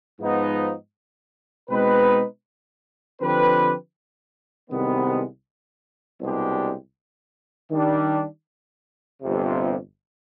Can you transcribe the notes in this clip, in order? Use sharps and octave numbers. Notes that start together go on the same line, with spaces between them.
G#2 F3 B3 D#4
B2 G#3 C4 D#4 B4
D3 F3 C4 G4 B4
C2 C3 D#3 G#3 B3
C2 B2 G#3 D4 G4
D#3 G3 D4
G1 F2 C3